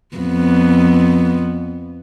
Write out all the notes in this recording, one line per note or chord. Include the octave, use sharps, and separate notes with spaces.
F2 B3